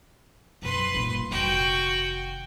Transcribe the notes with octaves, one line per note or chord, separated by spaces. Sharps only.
B1 F#2 B4 C6
G2 A#2
F1 D#3 F#4 G5